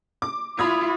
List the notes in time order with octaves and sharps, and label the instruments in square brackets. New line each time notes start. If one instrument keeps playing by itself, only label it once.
[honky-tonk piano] D6
[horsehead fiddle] E4 F4 [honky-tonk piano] B5 D#6 G#6